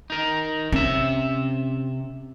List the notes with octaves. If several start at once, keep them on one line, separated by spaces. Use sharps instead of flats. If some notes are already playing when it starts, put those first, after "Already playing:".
D#4 A#4
C3 C#4 E5